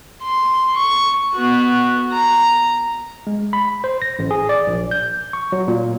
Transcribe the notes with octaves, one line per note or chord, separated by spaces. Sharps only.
C6
C#6
B3 F#4
A#5
G#3
B5
C5
A#6
A1
G#4
D5
A#1
G6
C#6
F#3
A#2